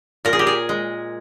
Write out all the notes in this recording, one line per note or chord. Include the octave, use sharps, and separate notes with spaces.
A#2 A#4
G#4
G4
G#4
G#3